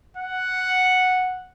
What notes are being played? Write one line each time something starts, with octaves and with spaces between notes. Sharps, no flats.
F#5